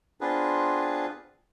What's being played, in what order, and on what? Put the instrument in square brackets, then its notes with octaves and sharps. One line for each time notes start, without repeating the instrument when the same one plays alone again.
[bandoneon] B3 C4 D4 F4 G#4 B4